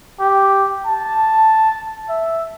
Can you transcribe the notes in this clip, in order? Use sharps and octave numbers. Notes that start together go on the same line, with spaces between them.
G4
A5
E5